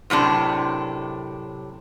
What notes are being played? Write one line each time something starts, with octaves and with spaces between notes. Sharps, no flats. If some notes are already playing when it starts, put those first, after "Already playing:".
F#2 A2 C3 D4